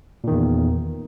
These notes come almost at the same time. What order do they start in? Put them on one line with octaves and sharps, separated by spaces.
A#2 D#3 E2